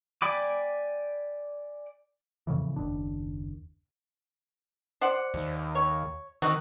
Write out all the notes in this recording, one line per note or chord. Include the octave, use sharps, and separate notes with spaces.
D5 G5 G#5 B5 D6
F2 A2 C#3 E3
F#1 D#2 D4
C5 D5 F#5
D#2
C#5
D#3 C4 D#4 F#4